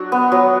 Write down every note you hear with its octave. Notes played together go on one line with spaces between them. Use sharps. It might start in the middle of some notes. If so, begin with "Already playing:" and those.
Already playing: F#3 D4 F#4
B3
F#3